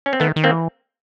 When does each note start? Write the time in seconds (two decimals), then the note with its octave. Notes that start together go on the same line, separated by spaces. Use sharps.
0.06 C#4
0.13 C4
0.20 D#3 A3 B3
0.36 D#3
0.44 A#3 C4
0.52 E3